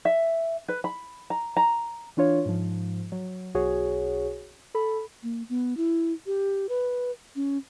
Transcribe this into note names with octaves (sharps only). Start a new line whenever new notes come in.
E5
B4
B5
A#5
A#5
E3 D4 F4 C#5
G#2 F3
F#3
B1 F#4 G#4 C#5
A4 B5
A#3
B3
E4
G4
B4
C#4